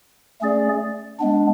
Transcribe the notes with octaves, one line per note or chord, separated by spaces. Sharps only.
A3 C#4 G#4 D5
G#3 B3 D4